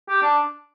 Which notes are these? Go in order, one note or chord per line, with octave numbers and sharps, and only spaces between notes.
G4
D4